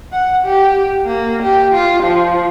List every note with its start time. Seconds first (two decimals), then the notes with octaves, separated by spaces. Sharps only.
0.12 F#5
0.45 G4
1.06 A#3
1.43 G4
1.75 F4
2.04 F3